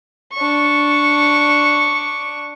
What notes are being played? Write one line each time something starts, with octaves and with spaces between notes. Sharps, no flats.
D4 C#6